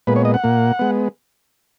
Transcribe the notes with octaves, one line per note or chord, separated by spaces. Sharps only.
A#2 G#3 B3 B4
C#5
D#5
F#5
A#2 A#3
G#3 B3